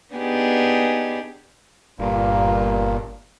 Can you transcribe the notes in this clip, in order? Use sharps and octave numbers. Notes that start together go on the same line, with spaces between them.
B3 D4 D#4 G4 G#4
G1 G2 A#2 A#3